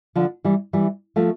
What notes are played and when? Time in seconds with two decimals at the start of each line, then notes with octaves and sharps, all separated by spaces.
0.15 D3 F3
0.44 E3 G3
0.73 E3 G3
1.16 F3 A3